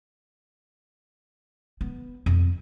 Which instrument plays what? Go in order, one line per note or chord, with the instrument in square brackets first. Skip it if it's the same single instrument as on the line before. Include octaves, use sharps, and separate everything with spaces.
[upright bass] B3
F2